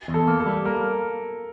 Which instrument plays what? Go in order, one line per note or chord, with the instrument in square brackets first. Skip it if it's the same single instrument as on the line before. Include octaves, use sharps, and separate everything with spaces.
[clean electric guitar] E2
[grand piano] A4
[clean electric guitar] A#3
[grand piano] A4
[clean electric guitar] G3
[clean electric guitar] A#3 [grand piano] A#4